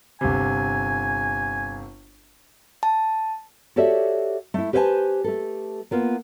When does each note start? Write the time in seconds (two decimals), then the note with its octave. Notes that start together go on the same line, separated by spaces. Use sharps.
0.21 G1 C3 G#5
2.83 A5
3.76 F#4 G4 A4 C#5 D5 E5
4.54 A3 E4
4.73 G4 B4 C5 E5 G#5 A5
5.24 A3 G4 A4
5.91 A#3 B3 F4